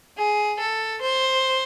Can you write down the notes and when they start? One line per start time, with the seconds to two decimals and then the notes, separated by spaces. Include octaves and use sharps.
0.17 G#4
0.60 A4
1.02 C5